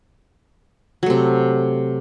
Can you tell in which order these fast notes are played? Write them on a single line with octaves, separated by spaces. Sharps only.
F#3 A3 C3